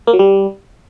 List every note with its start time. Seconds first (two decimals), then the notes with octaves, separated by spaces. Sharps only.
0.07 A#3
0.13 F#3
0.19 G3